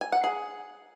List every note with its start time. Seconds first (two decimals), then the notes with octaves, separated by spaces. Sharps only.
0.01 G#5
0.12 F#5
0.24 G#4